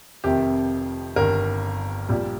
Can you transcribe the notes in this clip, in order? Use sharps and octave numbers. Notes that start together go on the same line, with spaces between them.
F1 F2 C3 D#3 G4
G1 G2 D#3 A#4
A#1 A#2 G3